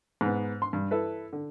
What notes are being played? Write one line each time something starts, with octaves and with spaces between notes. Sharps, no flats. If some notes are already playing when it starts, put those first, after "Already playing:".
G#2 B3
C6
G2
E4 A4 B4
D3